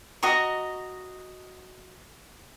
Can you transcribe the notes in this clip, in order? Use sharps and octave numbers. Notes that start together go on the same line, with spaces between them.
F#4 D#5 A#5 C#6